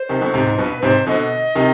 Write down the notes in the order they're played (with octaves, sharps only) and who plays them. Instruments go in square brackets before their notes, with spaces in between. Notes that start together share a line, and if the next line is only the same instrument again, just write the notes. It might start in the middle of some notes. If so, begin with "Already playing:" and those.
Already playing: [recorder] C5
[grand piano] C3 D#3
B2 D3
G#2 C3
G#2
[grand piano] G2 B2 [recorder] B4
[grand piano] G#2 C3 [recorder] C5
[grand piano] B2 D3 [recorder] D#5
[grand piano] C3 D#3